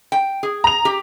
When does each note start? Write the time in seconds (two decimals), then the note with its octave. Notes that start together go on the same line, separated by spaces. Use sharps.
0.12 G5
0.43 G#4
0.64 A#5 F7
0.85 G4